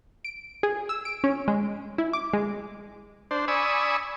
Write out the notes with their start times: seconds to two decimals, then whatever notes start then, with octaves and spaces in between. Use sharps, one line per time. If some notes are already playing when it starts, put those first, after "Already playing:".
0.25 D7
0.63 G#4
0.89 E6
1.05 D7
1.24 C#4
1.48 G#3
1.98 E4
2.13 D6
2.33 G#3
3.31 D4 C5
3.48 D5 G#5 B5 C#6 D#6 E6